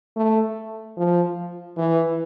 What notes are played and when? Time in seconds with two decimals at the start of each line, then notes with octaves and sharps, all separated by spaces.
0.17 A3
0.97 F3
1.77 E3